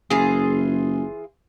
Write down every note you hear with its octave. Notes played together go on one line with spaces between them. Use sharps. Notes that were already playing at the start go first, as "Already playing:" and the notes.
F#1 E3 F4 G#4